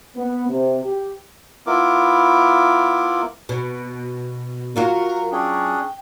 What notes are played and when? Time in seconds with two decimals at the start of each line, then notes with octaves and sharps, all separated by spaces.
0.16 B3
0.50 C3
0.84 G4
1.67 B3 E4 F4 A#4 D6
3.49 B2
4.76 F#3 F4 F#4 A#4
5.32 C#4 D4 G#4 G5